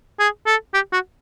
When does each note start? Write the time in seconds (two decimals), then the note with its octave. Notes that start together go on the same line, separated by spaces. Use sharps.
0.19 G#4
0.47 A4
0.74 G4
0.93 F#4